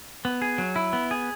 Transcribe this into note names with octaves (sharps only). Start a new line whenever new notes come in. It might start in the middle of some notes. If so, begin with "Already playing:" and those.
B3
G#4
F#3
E4
B3
G#4